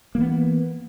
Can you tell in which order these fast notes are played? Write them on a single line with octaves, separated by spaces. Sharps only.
A#3 E3 B3